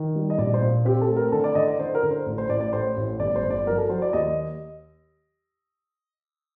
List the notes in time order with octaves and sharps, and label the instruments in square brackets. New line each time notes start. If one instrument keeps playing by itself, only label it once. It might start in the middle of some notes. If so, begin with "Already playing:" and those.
Already playing: [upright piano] D#3
G3
D#5
A#1 D5
C5
A#2
C4 G4
A4
A3
A#4
D3 A4
D5
D3 D#5
D5
D3 C5
A#4
D3
C5
A1
C5
A1 D5
D5
A2 C5
A1
G1 D5
C5
G1
D5
F#3 A#4
A4
F#3 C5
D5
D#2 D#5